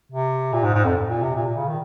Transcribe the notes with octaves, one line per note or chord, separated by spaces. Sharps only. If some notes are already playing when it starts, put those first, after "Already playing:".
C3
A#2
G#2
G#2
F2
A#2
C3
A#2
A#2
C#3
D#3